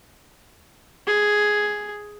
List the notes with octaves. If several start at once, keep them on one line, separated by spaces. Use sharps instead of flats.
G#4